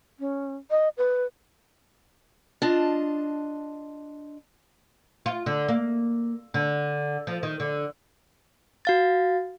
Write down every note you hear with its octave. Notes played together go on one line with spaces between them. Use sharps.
C#4
D#5
B4
D4 F4 D#5 A5
F4
D3
A#3
D3
F3
D#3
D3
F#4 F5 A6